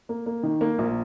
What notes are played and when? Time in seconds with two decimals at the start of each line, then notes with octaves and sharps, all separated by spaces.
0.09 A#3
0.26 A#3
0.43 D#3
0.61 A#3
0.79 A#1